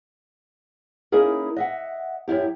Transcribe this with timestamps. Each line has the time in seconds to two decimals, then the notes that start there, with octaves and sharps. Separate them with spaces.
1.12 A#3 C#4 D#4 E4 G#4 A#4
1.56 D#5 E5 F#5
2.28 F#2 C#3 E4 G4